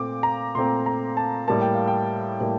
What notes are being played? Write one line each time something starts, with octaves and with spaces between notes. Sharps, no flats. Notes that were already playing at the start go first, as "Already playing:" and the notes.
Already playing: A#2 A3 C4 D6
A#5
A#2 A3 C4 C6
A#5
A5
A2 G3 A#3 A5
G5
F5
G5
A2 G3 A#3